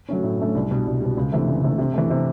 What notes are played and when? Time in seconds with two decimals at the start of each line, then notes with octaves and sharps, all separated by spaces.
0.09 F#3 A3 C#4
0.24 A2
0.39 F#3 A3 C#4
0.55 C2
0.71 B2 G3
0.86 C2
1.01 B2 G3
1.17 C#2
1.32 C3 E3 A3
1.48 C#2
1.63 C3 E3 A3
1.78 C3
1.94 E3 A3
2.10 C3